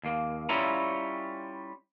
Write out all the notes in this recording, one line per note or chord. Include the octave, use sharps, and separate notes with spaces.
D#2 A#3
G3 C#4 E4 F4 C#5 A#5